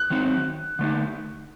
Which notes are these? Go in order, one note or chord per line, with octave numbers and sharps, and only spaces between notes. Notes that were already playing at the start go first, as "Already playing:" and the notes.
Already playing: F#6
D#3 F#3 C4 D#4
D3 A3 D#4